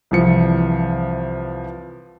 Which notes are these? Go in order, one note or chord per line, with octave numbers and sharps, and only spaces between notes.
C2 E3 F3 C#7